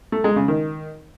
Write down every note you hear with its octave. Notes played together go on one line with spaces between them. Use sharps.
A3
G#3
C#3
D#3